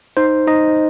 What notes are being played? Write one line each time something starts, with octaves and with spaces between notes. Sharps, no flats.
D#4 C5
D#4 D#5